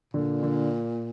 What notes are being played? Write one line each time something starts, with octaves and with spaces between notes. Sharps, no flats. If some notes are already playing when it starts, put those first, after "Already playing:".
A#2 D3
D3